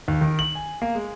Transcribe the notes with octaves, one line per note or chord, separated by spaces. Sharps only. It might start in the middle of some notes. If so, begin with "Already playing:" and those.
D#2
D#3
F#7
G#5
A#3
G#3